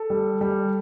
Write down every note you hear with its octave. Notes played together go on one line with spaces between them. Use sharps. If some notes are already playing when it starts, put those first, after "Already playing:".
Already playing: A4
G3
G3